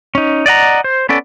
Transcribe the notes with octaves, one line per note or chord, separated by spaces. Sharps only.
C#4 D#4
D5 D#5 F#5 A#5
C5
B3 C#4 A4 D5